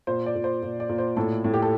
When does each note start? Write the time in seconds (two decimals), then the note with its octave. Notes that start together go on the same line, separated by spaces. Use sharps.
0.07 A#2 C5
0.26 D5
0.35 A#2
0.44 C5
0.62 A#2
0.80 D5
0.89 A#2
0.98 C5
1.17 A2 A4
1.44 A2
1.54 G4
1.62 A4